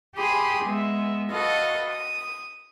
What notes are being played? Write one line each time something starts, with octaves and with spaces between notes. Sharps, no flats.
G4 G#4 B5 C6 D#6
G#3 B3 E5
F#4 A4 B4 D#5 F5
D#6